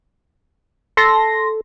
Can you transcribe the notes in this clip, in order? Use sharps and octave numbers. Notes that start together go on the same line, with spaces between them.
A4 C6 A#6